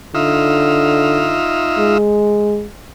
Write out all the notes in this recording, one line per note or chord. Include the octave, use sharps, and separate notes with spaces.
D3 D#4 F4 E5
G#3